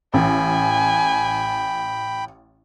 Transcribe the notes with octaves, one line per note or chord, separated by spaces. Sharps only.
A1 G5 G#5 B5